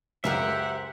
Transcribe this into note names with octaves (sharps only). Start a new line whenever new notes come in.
C#2 F#2 G4 G#4 A#4 C5 E5 F#5